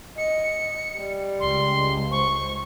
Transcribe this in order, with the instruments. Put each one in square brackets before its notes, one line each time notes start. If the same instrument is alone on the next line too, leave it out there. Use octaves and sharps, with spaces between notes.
[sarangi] D#5 [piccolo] C#7
[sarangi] G3
[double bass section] C#2 [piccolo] C6
[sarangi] C5 [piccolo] C#6